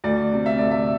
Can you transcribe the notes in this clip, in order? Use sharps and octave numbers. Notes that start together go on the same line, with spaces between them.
D2 D5
C3
E5
D2 D5
E5